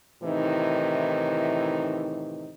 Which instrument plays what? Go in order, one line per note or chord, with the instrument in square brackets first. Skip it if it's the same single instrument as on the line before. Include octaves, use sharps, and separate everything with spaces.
[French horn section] A2 C3 D#3 E3 D#4